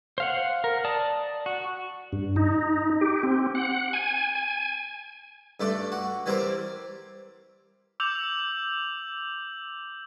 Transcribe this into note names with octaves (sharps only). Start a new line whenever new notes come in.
C5 F5 F#5
A#4
D5 A5 D#6
F#4
G2
D#4
G4
C4
F#5
G#5
G#5
G2 A3 D4
F#4
E3 G3 C4 A#4
D6 E6 G6 F7 F#7